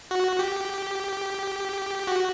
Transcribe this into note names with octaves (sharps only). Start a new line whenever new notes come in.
F#4
G4
F#4